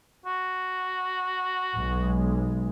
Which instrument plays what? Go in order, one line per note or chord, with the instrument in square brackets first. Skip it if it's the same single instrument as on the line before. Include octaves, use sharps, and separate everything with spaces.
[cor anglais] F#4
[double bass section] B1 G#3